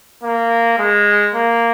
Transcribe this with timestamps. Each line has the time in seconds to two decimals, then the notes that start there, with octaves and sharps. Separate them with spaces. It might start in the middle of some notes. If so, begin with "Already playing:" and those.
0.23 A#3
0.79 G#3
1.35 A#3